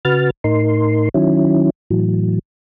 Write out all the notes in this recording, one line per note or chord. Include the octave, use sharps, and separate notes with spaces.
C#3 F#4 B4 F6 A6
A2 D#4 A#4 C6
D#3 F#3 C#4 E4
A2 E3 F#3